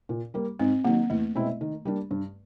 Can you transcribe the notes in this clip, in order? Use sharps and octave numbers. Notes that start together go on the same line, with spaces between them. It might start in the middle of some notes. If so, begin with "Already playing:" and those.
A#2
G3 A#3
G#2 C4
D#3 F#3 A#3
E2 A3
B2 G#3 C4 E4
D#3
G3 A#3 D4
G2